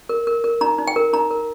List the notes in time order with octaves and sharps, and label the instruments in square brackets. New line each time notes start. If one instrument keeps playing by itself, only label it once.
[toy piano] A#4
A#4
A#4
D#4 A#5
D#4
G5
A#4
D#4 A#5
A#4